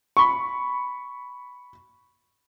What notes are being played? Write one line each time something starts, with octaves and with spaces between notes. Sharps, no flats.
B5 C#6